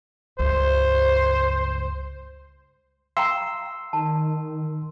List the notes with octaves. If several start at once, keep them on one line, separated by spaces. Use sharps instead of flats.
C#2 G2 C5
F5 G5 A#5 C6 E6
D#3 A5